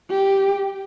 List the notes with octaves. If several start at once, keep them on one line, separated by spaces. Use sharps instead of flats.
G4